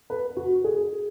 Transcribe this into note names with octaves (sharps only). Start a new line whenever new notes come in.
B4
F#4
G#4